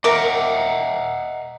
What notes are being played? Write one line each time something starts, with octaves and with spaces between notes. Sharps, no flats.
A#4 D#5 E5 F#5 D6